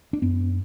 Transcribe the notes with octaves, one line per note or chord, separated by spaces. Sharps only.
D4
F#2 B3